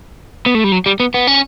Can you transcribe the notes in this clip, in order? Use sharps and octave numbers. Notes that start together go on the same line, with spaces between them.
B3
A3
G3
F#3
G3
B3
B3
C#4